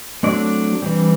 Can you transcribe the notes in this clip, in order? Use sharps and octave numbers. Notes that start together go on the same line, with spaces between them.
F#3 A3 C4 D4 D5
E3 G3 C4